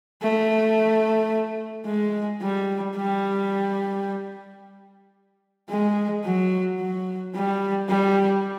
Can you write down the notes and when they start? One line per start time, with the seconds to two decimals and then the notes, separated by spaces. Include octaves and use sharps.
0.23 A3
1.86 G#3
2.42 G3
2.96 G3
5.70 G#3
6.24 F#3
6.79 F#3
7.34 G3
7.89 G3